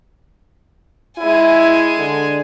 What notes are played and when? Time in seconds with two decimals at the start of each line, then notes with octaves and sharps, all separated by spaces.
1.18 G#3 E4 G#5
1.97 D3